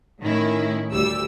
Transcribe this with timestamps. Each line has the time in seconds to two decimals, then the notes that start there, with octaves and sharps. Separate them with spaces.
0.21 A2 D#3 C#4 E4
0.90 D2 G3 E6